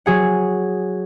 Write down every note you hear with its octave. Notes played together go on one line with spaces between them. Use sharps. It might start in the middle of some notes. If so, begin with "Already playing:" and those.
F#3 G#4 F#5